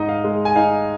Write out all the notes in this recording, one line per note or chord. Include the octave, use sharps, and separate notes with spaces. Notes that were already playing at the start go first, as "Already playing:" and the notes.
Already playing: G#2 D#4 D#5
F5
G#3
G#5
D#4 F5